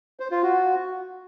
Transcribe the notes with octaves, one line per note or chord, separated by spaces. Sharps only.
C5
F4
F#4